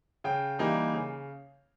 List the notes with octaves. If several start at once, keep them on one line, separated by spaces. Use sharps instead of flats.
C#3 G5
E3 G3 A#3 D#4
C#3